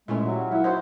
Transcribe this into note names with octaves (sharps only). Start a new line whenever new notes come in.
A#2 G#3 A3 C#4 E4 E5
F#3 G3 F#4
F4
A#3 E4 F#5
D#4 E4 F#4 C5